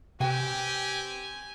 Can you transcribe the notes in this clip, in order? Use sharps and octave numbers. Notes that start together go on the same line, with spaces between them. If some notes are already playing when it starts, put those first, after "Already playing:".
C3 C4 G4 B4 G5 G#5